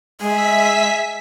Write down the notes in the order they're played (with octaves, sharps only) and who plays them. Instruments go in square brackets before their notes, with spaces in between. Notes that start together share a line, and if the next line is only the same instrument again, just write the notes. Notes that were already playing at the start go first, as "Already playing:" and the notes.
[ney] G#3 [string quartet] G#4 [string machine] E5 B6